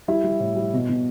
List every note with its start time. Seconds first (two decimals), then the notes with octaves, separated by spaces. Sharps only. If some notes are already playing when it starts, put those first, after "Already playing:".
0.08 G3 E4
0.24 G3
0.40 A2
0.56 G3
0.73 B2
0.89 B2